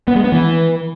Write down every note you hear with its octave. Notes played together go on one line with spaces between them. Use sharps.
B3
G#3
B3
E3